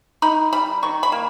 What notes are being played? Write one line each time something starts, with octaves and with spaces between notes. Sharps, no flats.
D#4 B5
G3 B5
D#3 C#6
B5
A#3